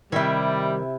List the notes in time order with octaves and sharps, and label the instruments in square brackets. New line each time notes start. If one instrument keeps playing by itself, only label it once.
[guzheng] C3 E4 [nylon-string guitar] D#3 E5 [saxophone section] G3